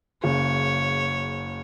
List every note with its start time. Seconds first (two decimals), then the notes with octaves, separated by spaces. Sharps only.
0.23 F#1 C#3 C#5